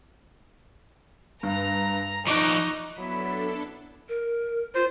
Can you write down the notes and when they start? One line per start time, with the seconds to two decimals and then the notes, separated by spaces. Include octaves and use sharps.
1.43 G2 A#5
2.27 F3 D#4 D5 C#6 F#6
2.98 F#3 B3 D4 E4 A4
4.09 A#4
4.75 F4 C5